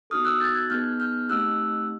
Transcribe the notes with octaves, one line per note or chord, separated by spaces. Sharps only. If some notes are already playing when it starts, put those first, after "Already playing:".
B3 D#4 F#4 A4 D#6 F6
E6 F#6
G6 A6
F#6 G#6
B3 D#4 G#4 F6 G6
F6 G6
A3 C4 D#4 G4 E6 F#6